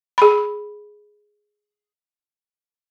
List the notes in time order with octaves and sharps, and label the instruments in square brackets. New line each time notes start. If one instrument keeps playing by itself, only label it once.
[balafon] G#4 B5